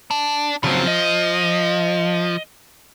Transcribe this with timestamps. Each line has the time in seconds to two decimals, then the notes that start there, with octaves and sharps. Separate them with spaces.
0.11 D4
0.64 C#3 F3 F#3 C4
0.87 D#5